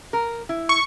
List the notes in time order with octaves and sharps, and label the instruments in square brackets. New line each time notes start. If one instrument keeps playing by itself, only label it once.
[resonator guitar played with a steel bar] A#4
E4
[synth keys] C#6